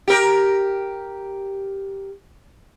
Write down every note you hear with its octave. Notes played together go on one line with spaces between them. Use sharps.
G4 A#4